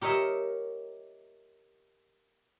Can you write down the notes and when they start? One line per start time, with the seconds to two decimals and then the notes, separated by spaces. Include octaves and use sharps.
0.01 G4 A#4 C#5 D#5 E5